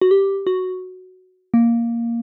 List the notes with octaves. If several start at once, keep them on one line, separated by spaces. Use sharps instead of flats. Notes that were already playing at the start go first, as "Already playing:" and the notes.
F#4
G4
F#4
A#3